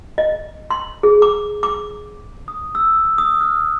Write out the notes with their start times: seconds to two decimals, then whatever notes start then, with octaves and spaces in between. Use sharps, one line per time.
0.18 D#5
0.71 C6
1.03 G#4
1.22 D6
1.63 D6
2.48 D#6
2.75 E6
3.18 D#6
3.41 F6